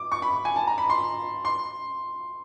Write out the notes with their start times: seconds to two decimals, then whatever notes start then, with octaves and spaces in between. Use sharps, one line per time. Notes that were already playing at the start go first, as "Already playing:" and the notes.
Already playing: D6
0.12 C#6
0.22 B5
0.45 G#5
0.56 A5
0.67 A#5
0.78 B5
0.90 C6
1.45 C6